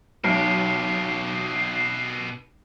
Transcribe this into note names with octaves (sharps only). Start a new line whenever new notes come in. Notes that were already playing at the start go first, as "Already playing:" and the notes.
B1 B2 G4 C7